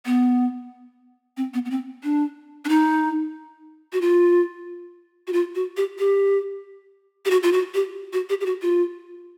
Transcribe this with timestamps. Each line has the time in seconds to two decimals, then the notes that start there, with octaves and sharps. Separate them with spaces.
0.06 B3
1.37 C4
1.54 B3
1.65 B3
1.71 C4
2.03 D4
2.65 D4
2.69 D#4
3.93 F#4
4.01 F4
5.27 F#4
5.33 F4
5.55 F#4
5.77 G4
5.99 G4
7.25 G4
7.31 F#4
7.43 F4
7.53 F#4
7.74 G4
8.13 F#4
8.29 G4
8.41 G4
8.46 F#4
8.62 F4